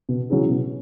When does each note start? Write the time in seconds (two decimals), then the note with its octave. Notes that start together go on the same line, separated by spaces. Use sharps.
0.09 B2
0.30 F#3 C#4 E4 G#4
0.49 B2